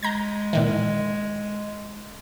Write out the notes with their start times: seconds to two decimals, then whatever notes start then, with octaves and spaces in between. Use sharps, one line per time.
0.03 G#3 A#5 G6 G#6
0.53 A#2 D#3 E3